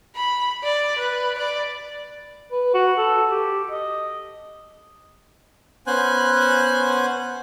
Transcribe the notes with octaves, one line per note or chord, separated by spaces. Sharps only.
B5
D5
B4
D5
B4
F#4
A4
G4
D#5
B3 C#4 C5 G#5 F#6